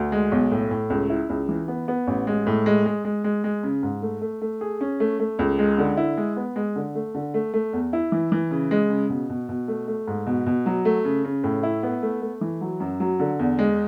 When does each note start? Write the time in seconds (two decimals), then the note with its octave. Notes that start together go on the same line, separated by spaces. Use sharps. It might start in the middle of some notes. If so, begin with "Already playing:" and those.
Already playing: D2
0.12 G#3
0.32 B1
0.52 A2
0.71 A2
0.90 C#2
1.10 E4
1.29 C#2
1.49 E3
1.68 B3
1.88 B3
2.07 A1
2.27 G#3
2.47 A2
2.66 G#3
2.86 G#3
3.05 G#3
3.24 G#3
3.44 G#3
3.63 C#3
3.83 G#2
4.02 A3
4.21 A3
4.42 A3
4.61 G#4
4.81 C#4
5.00 A3
5.20 A3
5.39 C#2
5.59 G#3
5.78 D3
5.97 E4
6.17 G#3
6.37 B3
6.56 G#3
6.76 D3
6.95 A3
7.15 D3
7.34 A3
7.54 A3
7.73 E2
7.93 E4
8.12 E3
8.32 E3
8.51 C#3
8.71 G#3
8.90 C#3
9.09 B2
9.30 B2
9.49 B2
9.68 A3
9.88 A3
10.08 G#2
10.27 B2
10.46 B2
10.66 F#3
10.85 A3
11.05 C#3
11.25 C#3
11.44 A2
11.63 E4
11.83 B3
12.02 A3
12.22 A3
12.41 E3
12.61 F#3
12.80 F#2
13.00 F#3
13.19 D3
13.39 E2
13.59 G#3